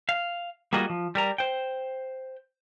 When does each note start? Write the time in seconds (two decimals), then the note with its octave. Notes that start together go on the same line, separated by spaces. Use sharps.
0.09 F5
0.73 G3 A#3 F4 F#4 G#4 D#5
0.90 F3
1.15 G3 A#4 A#5
1.38 C5 G5